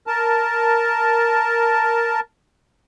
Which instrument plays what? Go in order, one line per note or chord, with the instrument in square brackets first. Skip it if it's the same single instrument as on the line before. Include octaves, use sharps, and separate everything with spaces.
[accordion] A#4 A5